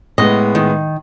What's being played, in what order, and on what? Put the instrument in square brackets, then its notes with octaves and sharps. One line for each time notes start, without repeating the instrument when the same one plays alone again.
[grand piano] A2 G#3 B3 [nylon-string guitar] D#5
[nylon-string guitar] D#3